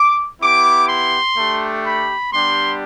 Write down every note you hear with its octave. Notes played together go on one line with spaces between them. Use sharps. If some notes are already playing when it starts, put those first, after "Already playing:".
Already playing: D6
B3 E4 G4 D6
C6
A3 D4 G4
B5
G3 B3 D4 G4 C6